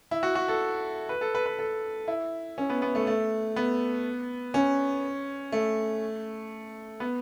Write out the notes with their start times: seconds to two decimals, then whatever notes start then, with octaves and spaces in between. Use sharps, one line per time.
0.11 E4
0.23 F#4
0.35 F#4
0.48 A4
1.09 B4
1.21 A4
1.35 B4
1.46 B4
1.59 A4
2.08 E4
2.58 C#4
2.70 B3
2.82 B3
2.95 A3
3.07 A3
3.56 B3
4.54 C#4
5.52 A3
7.00 B3